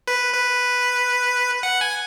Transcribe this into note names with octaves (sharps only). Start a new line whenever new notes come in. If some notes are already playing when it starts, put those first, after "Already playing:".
B4
B4
F#5
G#5